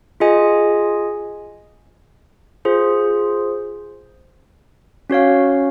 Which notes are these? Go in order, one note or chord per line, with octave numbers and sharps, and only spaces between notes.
F4 G#4 D#5 G#5
F4 G#4 C5
C#4 F#4 C#5 F5